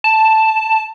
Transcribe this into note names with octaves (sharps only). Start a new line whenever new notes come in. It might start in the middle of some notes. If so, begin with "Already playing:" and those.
A5